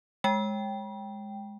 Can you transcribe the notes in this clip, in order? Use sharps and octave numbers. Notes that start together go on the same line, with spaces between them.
G#3 G5